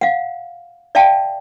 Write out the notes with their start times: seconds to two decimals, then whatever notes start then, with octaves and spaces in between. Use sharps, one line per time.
0.01 F5 F#5
0.95 D5 E5 F5 G5 A5